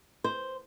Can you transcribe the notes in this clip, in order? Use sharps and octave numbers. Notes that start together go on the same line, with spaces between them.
C5